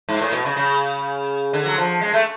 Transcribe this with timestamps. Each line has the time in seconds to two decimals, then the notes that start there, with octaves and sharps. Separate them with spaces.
0.09 G#2
0.21 A2
0.33 B2
0.45 C#3
0.57 C#3
1.53 D3
1.65 F#3
1.78 F3
2.01 G#3
2.14 A3